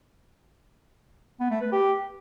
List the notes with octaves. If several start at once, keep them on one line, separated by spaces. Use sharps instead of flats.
B3
A3
B4
G4